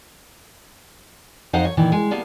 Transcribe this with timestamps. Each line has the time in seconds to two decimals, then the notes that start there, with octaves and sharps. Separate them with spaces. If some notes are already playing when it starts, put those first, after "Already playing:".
1.53 F2 D#4 C5 F5 F#5
1.65 C#5
1.77 A#2 D#3 E3
1.92 G#3
2.11 G3 A#3 B3 F5 A5